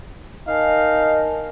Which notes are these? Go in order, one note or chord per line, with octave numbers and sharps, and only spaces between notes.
D#4 A#4 F5 G#5 A5